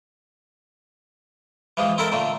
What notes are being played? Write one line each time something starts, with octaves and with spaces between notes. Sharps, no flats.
E3 F3 G#3
C4 E4 A4 A#4 C5
A#2 D3 A3